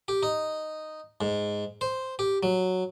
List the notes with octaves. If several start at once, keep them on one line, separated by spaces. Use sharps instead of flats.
G4
D#4
G#2
C5
G4
F#3